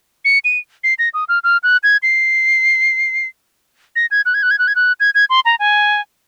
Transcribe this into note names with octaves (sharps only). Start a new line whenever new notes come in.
C#7
D#7
C7
A#6
D#6
F6
F6
F#6
G#6
C7
A#6
G#6
F#6
G#6
F#6
G#6
F#6
G#6
F#6
G#6
G#6
C6
A#5
G#5